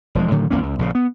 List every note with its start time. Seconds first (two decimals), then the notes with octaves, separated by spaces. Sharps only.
0.15 E1 F3 G#3
0.31 A2 D3 D#3 F#3
0.50 G#1 E2 A#3 C#4
0.63 C#2
0.79 A#1 C#3
0.95 B3